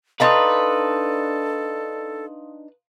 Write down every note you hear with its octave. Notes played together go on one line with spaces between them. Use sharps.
D4 D#4 A4 B4 F5 A#5 C6 D#6